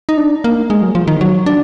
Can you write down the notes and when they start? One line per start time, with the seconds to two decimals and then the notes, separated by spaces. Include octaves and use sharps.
0.09 D#4
0.18 D4
0.44 A#3
0.70 G#3
0.82 F#3
0.95 F3
1.07 D#3
1.21 F#3
1.46 D4